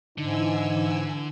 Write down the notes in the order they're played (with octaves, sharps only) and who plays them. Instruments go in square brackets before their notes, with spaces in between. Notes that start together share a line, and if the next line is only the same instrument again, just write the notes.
[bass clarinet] G#2 [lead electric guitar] D3 [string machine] E3 G#5 E6 [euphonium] D#4